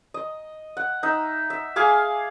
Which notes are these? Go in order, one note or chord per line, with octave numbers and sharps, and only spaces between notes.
D#5
F#5
D#4 E5
E5
G#4 F5 G#5 D6